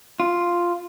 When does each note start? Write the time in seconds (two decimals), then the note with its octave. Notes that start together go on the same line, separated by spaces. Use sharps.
0.20 F4